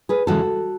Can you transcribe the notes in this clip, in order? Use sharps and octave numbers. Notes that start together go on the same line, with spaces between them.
G#4 B4
E2 C#3 E3 G#3 F#4 A4